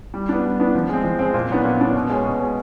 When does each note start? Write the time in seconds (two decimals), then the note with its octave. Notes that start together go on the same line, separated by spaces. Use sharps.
0.14 G3
0.29 B3 D4
0.43 G3
0.60 B3 D4
0.75 F3
0.89 G#3 C4
1.04 F3
1.19 G#3 C4
1.34 A#2
1.50 F#3 B3 D4
1.65 A#2
1.80 F#3 B3 D4
1.95 B2
2.09 G#3 C#4
2.25 B2
2.40 G#3 C#4